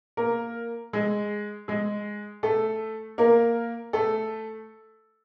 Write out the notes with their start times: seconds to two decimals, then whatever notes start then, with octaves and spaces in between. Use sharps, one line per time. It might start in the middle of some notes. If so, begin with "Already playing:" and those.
0.17 A#3 A#4
0.93 G#3 G#4
1.68 G#3 G#4
2.43 A3 A4
3.18 A#3 A#4
3.93 A3 A4